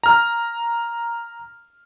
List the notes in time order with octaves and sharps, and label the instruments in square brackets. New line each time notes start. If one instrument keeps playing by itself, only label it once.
[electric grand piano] A#5 F6